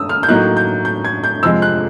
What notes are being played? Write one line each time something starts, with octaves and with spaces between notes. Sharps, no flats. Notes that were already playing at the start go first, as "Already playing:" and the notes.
Already playing: D#6 E6
F6
G6
A2 F#3 A#3 D#4 F#6
G6
G6
G#6
G6
F2 C3 F3 G#3 E6
F#6